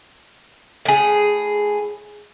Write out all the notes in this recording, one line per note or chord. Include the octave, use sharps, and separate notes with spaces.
A2 G#4